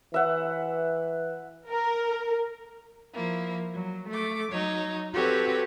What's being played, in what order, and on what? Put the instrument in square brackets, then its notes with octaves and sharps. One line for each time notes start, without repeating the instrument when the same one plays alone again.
[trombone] E3 [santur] E5 F#5
[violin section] A#4
[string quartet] F3 A#3 E4
F#3
A3 D6
F#3 D#4 C#5
C4 F#4 G4 A4 B4 C#5